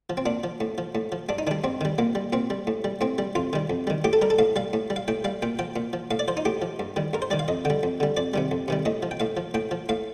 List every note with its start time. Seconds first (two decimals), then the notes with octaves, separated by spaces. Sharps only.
0.10 F3
0.17 C4
0.26 A#2 D4
0.44 F3
0.61 A2
0.78 F3
0.95 A2
1.12 F3
1.29 G2 D4
1.38 D#4
1.47 D#3 G3 D4
1.64 G2 C4
1.81 D#3 G3
1.98 A#2 A#3
2.15 G3
2.33 A#2 C4
2.50 G3
2.67 A2
2.84 G3
3.01 A2 C4
3.18 G3
3.35 F2 F4
3.53 D#3 G3
3.70 F2
3.87 D#3 G3
4.04 A2 G4
4.13 A4
4.22 G3 A#4
4.30 A4
4.39 A2 F5
4.56 G3 F5
4.73 A2
4.90 G3
4.96 F5
5.08 A2 G5
5.24 G3 F5
5.42 A#2 G5
5.59 F3 G5
5.76 A#2
5.93 F3
6.11 A2 F5
6.19 D5
6.28 F3 C5
6.37 D#4
6.45 A2 G4
6.62 F3
6.79 G2
6.96 D#3 G3
7.13 G2 A#4
7.22 C5
7.30 D#3 G3 D5
7.39 F5
7.48 F2 D#5
7.65 D3 G3 G5
7.83 F2
8.00 D3 G3
8.17 F2 D5
8.34 C3 D#3 G3
8.51 F2
8.68 C3 D#3 G3
8.85 A2 D#5
9.03 F3
9.11 G5
9.20 A2 F5
9.37 F3
9.54 A2 G5
9.71 F3
9.89 A2 F5